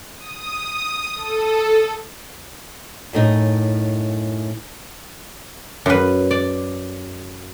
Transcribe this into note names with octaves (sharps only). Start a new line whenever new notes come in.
D#6
A4
F#2 A2 D#4
F#2 B4
D5